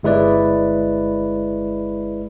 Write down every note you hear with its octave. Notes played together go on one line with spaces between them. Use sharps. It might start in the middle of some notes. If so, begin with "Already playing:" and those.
G1 G#3 E4 B4 D5